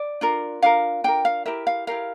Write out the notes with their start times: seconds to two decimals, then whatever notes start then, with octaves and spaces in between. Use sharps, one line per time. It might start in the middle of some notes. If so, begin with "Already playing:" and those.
Already playing: D5
0.21 D4 F4 A#4
0.62 D4 F4 A#4 F5
1.04 D4 F4 A#4 G5
1.25 F5
1.46 E4 G4 A#4 E5
1.67 F5
1.87 E4 G4 A#4 F5